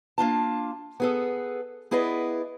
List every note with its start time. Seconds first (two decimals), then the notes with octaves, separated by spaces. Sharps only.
0.18 A#3 D4 F4 A5
1.00 B3 G#4 A4
1.91 B3 E4 G#4 B4 D5 D#5